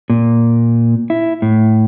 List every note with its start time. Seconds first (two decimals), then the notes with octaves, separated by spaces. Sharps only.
0.10 A#2
1.10 E4
1.42 A2